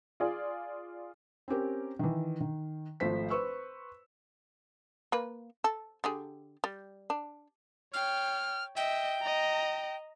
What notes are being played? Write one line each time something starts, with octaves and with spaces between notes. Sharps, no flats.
F4 G#4 D5
C4 C#4 G4 A#4
D#3 E3
D#3
G#1 F3 A3 C5 B6
B4 C5 C#6 E6
A#3 B4
A4
D3 G4 G#4
G3
D4
C#5 G5 F6
D#5 E5 G5
D#5 A#5